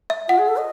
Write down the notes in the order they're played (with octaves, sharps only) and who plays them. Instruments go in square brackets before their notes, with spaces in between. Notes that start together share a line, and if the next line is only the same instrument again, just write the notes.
[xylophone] E5
[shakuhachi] F4 [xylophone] F#5
[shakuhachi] G#4
A4
D#5